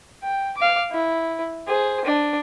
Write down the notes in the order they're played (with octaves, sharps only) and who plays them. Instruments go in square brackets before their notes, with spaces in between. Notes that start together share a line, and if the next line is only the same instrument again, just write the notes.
[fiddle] G5
F5 D6
E4
G#4 C5
D4